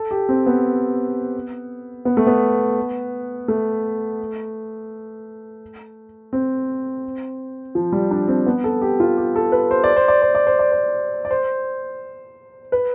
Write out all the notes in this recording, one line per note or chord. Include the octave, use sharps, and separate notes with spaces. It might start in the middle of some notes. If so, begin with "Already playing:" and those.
Already playing: A4
G4
C4
B3
B3
A3
B3
A3
C4
F3
G3
D4
C4
B3
A4
G4
F4
G4
A4
B4
C5
D5
C5
D5
C5
D5
C5
D5
C5
D5
C5
B4